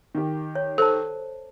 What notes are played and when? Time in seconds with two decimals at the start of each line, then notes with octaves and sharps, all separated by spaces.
0.15 D#3 G4
0.55 C#5
0.78 A4 C5 A5